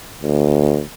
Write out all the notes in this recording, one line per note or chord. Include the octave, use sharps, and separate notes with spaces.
D2